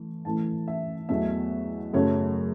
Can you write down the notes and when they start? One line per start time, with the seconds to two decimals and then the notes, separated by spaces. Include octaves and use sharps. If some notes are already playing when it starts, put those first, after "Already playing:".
Already playing: E3 A3
0.25 A2 E3 A3 A5
0.68 E5
1.09 E2 B2 F#3 A3 E5
1.93 F#2 C#3 F#3 A3 C#5